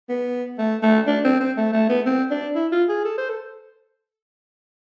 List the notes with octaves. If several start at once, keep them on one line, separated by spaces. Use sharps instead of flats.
B3
A3
A3
D4
C4
C4
A3
A3
B3
C4
D4
E4
F4
G#4
A4
C5
A4